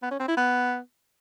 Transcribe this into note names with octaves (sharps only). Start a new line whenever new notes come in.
B3
C#4
C4
E4
B3